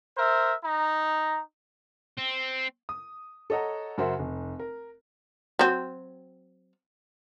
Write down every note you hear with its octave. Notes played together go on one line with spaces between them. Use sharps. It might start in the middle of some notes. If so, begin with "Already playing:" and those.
A#4 C5 E5
D#4 A#5
C4
D#6
A4 C#5 D#5 F#5 A#5
F#2 C#3 F#4 A#4 C5 E5
F1
A#4
F#3 C4